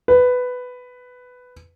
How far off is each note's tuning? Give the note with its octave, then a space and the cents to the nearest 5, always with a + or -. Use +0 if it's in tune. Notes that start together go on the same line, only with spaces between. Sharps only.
B4 +10